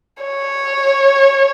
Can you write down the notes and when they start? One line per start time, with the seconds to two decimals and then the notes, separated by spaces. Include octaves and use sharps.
0.23 C#5